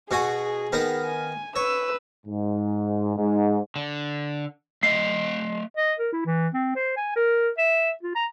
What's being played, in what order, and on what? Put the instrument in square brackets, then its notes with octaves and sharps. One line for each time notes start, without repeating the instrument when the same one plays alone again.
[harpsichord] B2 F#4 G#5 [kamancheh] G#4
[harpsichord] D#3 B3 A#4
[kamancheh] G#5
[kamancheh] B4 E6 [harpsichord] C#5
[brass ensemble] G#2
G#2
[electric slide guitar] D3
[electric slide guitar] A3 D#5 E5 [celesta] C7
[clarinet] D#5
A#4
E4
E3
C4
C5
G#5
A#4
E5
F4
A#5